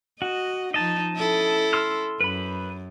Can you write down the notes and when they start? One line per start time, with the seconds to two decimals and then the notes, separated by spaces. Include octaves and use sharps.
0.22 F#4 D#5
0.74 F3 D#4 D#5 A5
1.15 C#4 E4 A4
1.73 C6 E6 F6
2.21 F#2 B4 B5